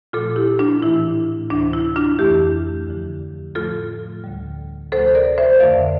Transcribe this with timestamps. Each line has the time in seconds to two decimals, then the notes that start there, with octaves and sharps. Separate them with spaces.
0.13 A#2 F3 A3 F4 A4
0.36 E4 G4
0.59 D4 F4
0.82 A2 E3 A3 E4
1.50 D2 C3 E3 D4
1.73 E4
1.96 D4 F4
2.19 F2 E3 A3 E4 G4
2.87 E2 D3 F3
3.55 A2 F3 A3 F4 A4
4.24 D2 D3 G3
4.92 D2 C3 F3 A3 A4 C5
5.15 A#4 D5
5.38 C5 E5
5.60 F2 D3 A3 D5 F5